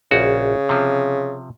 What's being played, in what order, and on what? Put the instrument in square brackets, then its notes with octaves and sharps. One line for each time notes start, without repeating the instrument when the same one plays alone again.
[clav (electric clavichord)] A#1 F#4 [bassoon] C#3
[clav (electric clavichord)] C3 F3